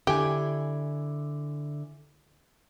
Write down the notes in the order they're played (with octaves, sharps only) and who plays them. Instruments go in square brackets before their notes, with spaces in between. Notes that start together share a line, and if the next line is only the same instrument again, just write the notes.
[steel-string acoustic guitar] D3 E4 G#5 [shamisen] G4